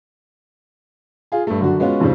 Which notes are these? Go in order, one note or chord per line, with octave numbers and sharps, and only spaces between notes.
F4 G#4
G2 A3
F#2 D3 F#4
G#3 B3 C#4 F4 F#4
F2 G#2 C#3 F3 G3 C4